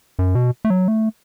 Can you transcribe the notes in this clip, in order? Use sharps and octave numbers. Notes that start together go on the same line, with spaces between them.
F#2
B2
A3
F#3
A3